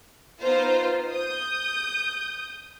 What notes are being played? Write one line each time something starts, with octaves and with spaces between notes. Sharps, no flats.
B3 D#4 F4 C5
D#6 G6